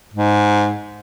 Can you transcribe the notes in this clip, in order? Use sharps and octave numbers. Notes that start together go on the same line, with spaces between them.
G#2